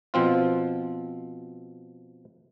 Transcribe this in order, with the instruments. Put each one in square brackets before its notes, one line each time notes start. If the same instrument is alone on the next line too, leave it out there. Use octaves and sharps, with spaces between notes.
[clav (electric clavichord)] B2 F3 C4 F4